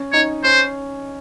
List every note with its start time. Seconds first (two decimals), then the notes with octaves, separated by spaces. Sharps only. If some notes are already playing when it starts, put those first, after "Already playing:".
Already playing: C#4
0.12 D#4 C#5
0.44 C#4 C5